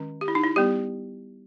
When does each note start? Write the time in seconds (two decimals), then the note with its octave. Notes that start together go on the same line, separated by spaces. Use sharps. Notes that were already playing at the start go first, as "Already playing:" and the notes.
Already playing: D#3 G#3 C#4
0.21 G4
0.28 E4
0.35 D#4
0.44 E4
0.56 G3 B3 G4